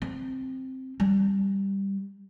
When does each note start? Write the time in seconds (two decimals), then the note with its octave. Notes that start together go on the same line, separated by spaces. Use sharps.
0.02 C4
1.00 G3